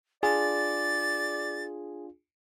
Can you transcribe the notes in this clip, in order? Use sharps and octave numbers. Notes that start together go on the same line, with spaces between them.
D4 F4 G#4 D5 A6